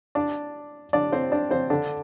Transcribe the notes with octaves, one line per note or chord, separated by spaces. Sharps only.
D4 D5
D4 D5
C4 C5
D4 D5
C4 C5
D3 D4